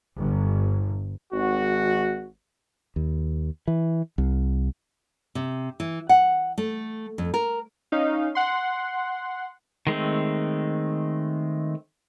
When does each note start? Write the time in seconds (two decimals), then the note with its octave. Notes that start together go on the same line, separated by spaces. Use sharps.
0.17 G1
1.33 G#1 F#4
2.96 D#2
3.67 E3
4.18 C2
5.35 C3
5.80 E3
6.09 F#5
6.58 A3
7.18 F2
7.34 A#4
7.92 C#4 D#4 F5
8.35 F#5 C6
9.87 D#3 G#3 A3 C4